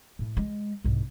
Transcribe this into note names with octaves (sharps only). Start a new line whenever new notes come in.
A2
G#3
C2 G#2